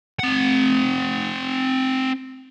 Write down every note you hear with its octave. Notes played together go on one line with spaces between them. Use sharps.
C4 F#5